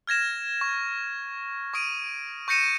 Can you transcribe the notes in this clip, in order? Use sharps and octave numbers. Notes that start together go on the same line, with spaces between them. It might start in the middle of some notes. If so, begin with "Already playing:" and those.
F6 G#6 A#6 E7
C#6
C#6 D#6 D7 D#7
C#6 G6 A#6 C#7 D#7 E7